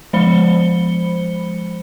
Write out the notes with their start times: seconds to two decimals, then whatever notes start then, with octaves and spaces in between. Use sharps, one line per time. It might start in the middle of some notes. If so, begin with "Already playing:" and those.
0.13 F3 G#3 C5 B5 C#7 G7